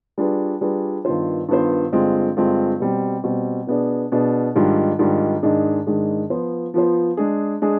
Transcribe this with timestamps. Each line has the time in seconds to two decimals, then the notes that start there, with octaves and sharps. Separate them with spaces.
0.18 G3 D4 F4 G#4 B4
0.61 G3 D4 F4 G#4 B4
1.05 G2 D#3 B3 F4 C5
1.48 G2 D#3 B3 F4 C5
1.92 G2 D3 G#3 C4 F4
2.36 G2 D3 G#3 C4 F4
2.80 B2 G3 C4
3.24 B2 G3 C4
3.67 B2 B3 D4 G#4 D5
4.12 B2 B3 D4 G#4 D5
4.55 G#2 D#3 G3 D4 F4
4.99 G#2 D#3 G3 D4 F4
5.43 G#2 D#3 G#3 D4 G#4
5.87 G#2 D#3 G#3 D4 G#4
6.30 F3 B3 F4 C5
6.74 F3 B3 F4 C5
7.17 G#3 D4 G#4
7.62 G#3 D4 G#4